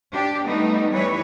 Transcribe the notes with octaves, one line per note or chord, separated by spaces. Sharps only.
D4 G4
G3 A3 B3 D#4
E3 G3 B4 C#5